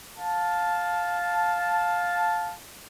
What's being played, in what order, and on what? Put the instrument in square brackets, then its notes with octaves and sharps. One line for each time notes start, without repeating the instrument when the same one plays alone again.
[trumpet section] F5 A5